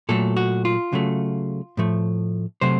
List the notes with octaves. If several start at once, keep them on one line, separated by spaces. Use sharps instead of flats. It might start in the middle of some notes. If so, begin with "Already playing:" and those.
A#2 F#3 A3 A4
F#4
F4
C#3 F#3 A3
A2 F3 A3
C3 F#3 A3 C5